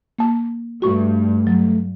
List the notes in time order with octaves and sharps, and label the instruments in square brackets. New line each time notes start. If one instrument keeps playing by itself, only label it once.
[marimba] A#3 A5
[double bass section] G2 [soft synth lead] A3 [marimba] F#4 C#6
[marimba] F#3